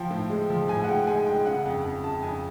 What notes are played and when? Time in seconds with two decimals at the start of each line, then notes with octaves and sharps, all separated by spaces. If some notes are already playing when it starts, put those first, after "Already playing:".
Already playing: F3 G5
0.10 A2
0.30 G#3
0.50 F3
0.68 A2 G#5
0.84 F#5
0.88 G#3 G5
1.07 G#3 G#5
1.26 G#3 G5
1.46 C#3 F#5
1.59 F#5
1.65 F2 G5
1.84 F2
2.04 C#3 A5
2.22 F2 G#5